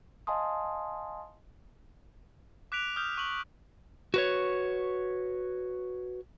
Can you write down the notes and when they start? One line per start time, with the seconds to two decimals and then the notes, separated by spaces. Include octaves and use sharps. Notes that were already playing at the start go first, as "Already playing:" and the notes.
0.27 D#5 F5 G#5 A5 C6 D#6
2.72 D6 F#6 B6 D7 F7
2.96 D#6 F6 G6
3.18 C#6 F#7
4.14 F#4 B4 C#5